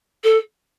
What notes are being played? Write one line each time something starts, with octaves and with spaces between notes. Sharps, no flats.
A4